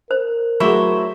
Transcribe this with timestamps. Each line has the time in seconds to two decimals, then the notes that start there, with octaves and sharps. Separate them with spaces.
0.11 A#4 C5
0.60 F#3 A3 E4 F#4 G#4 C5 C#5 C#6